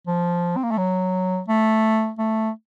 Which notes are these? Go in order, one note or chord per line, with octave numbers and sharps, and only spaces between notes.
F3
C4
A#3
A3
F#3
A3
A3